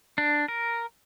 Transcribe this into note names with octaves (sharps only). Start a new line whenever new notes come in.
D4
A#4